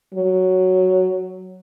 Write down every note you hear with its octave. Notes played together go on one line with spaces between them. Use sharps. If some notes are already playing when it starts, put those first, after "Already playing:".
F#3